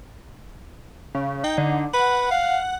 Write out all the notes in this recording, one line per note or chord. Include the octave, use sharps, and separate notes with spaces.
C#3
D#4 G5
D3
B4 F#5
F5